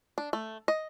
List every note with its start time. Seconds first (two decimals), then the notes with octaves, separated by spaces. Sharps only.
0.18 D4
0.33 A3
0.68 D#5